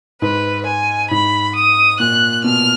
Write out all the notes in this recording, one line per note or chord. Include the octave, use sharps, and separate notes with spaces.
G#2 B4
G#5
G#2 B5
D#6
A#2 F#6
B2 F6